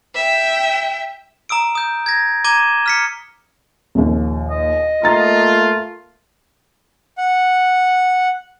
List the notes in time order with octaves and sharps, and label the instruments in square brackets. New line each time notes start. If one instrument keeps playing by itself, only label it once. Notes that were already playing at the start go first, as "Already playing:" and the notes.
[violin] E5 G5
[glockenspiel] A#5 D#6 E6 D7
D#6 G6
G#6 A#6
A#5 D6 G#6 D#7 E7 G7
F6 B6 C#7
[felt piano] A#1 D#2
[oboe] D#5
[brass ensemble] A3 A#3 F4 [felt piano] A#5 A6
[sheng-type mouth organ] F#5